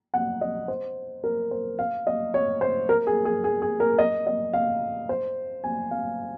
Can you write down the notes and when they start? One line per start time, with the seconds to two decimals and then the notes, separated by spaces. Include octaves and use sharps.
0.14 F#5
0.41 D#5
0.68 C5
1.24 A#4
1.51 C5
1.79 F5
2.07 D#5
2.34 C#5
2.61 C5
2.89 A#4
3.07 G#4
3.25 G#4
3.44 G#4
3.62 G#4
3.80 A#4
3.98 D#5
4.27 D#5
4.53 F5
5.09 C5
5.64 G#5
5.91 F5